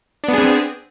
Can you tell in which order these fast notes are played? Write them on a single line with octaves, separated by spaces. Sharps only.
D4 B3 G#4 C4